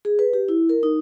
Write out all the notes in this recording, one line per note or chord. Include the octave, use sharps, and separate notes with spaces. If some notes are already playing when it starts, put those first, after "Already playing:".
G#4
B4
G4
E4
A#4
D#4